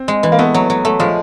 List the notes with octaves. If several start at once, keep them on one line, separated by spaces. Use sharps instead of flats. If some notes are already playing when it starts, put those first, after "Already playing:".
Already playing: C4
G#3
E3
A#3
A3 B3
F#3
F#3
A3
F3 G#3